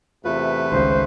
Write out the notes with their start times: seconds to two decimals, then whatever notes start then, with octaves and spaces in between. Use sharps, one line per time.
0.25 E2 C3 A3 F4 B4
0.71 G#1 C#2 C#3 C5